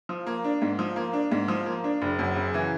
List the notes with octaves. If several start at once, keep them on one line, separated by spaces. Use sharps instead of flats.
F3
A#3
D4
G#2
F3
A#3
D4
G#2
F3
A#3
D4
F#1
F#2
C#3
E3